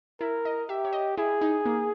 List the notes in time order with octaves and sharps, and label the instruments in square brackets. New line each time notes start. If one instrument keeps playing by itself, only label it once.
[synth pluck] E4 [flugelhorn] A#4
[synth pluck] D#5
[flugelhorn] G4 [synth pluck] E5
[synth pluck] C#5
D#5
[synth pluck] E4 [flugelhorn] G#4
[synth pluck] D#4
A#3